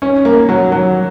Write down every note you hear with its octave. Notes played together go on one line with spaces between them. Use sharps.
C#4
A#3
F#3
F#3